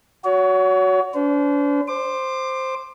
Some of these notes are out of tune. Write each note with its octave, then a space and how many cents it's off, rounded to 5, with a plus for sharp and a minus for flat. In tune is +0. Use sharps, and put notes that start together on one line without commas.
F#4 +0 C#5 +30
D4 -40 C5 -40
C5 +0 D6 +25